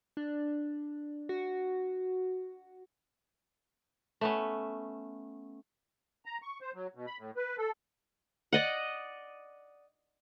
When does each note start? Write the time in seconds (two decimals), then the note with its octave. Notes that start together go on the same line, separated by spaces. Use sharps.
0.17 D4
1.29 F#4
4.21 A3 B3 C#4
6.26 A#5
6.42 C#6
6.61 C5
6.74 F#3
6.95 B2
7.07 B5
7.18 A2
7.37 B4
7.58 A4
8.53 D5 D#5 F#5